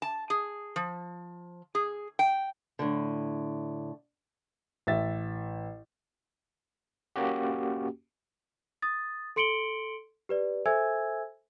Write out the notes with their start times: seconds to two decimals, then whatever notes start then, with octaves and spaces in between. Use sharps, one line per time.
0.02 A5
0.30 G#4
0.76 F3
1.75 G#4
2.19 G5
2.79 A2 D3
4.87 A1 E5 A6
7.16 A#3 C#4 F#4 G4
8.82 D#6 A6
9.36 A4 C6 C#7 D7 F#7 G7
10.29 G4 B4 D5
10.66 A4 C5 E5 G#5 E6 G#6